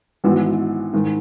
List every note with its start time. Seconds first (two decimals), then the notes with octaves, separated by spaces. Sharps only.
0.24 G#1 G#2 E3 B3 F#4
0.93 G#2 D#3